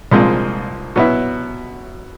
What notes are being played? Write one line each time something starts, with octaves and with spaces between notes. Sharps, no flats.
C2 A#2 F3 G#3 C4
B2 F#3 B3 E4